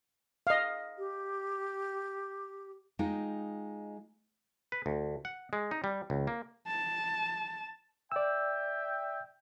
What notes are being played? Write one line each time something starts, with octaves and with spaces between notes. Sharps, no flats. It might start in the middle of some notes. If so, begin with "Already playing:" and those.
D#5 F5
G4
G#3 D#4 F4 G5
B4
D2
F#5
G#3
D#4
G3
C#2
A#3
A5
D5 E5 G5 E6